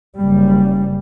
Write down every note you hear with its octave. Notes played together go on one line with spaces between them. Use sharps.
F#1 G3